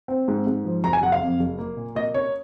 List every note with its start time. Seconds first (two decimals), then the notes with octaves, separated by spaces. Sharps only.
0.08 C4
0.28 G#2
0.47 G#2
0.65 F3
0.83 F#1 A#5
0.93 G#5
1.02 F#1 F#5
1.12 F5
1.22 F2
1.39 F#1
1.58 A#3
1.77 A#2
1.95 A#3 D#5
2.14 C#4 C#5